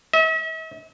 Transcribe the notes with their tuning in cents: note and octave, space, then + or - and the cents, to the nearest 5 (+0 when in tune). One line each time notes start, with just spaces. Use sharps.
E5 -45